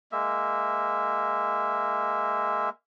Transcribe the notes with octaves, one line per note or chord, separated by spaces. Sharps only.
G#3 A#3 E5